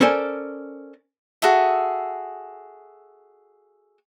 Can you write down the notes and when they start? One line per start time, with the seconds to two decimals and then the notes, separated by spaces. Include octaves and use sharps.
0.01 C#4 A4 A#4 C5 D5 G#5
1.42 F#4 G#4 A4 E5